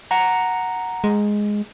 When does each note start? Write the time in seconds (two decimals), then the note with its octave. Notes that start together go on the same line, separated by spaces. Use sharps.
0.11 F#5 A#5
1.04 G#3